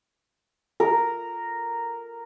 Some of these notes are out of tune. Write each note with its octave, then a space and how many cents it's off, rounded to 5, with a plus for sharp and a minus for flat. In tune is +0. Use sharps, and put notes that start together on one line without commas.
A#4 -5